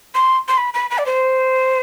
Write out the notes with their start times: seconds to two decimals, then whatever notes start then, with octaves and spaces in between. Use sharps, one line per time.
0.15 C6
0.48 C6
0.57 B5
0.74 B5
0.90 B5
0.98 D5
1.06 C5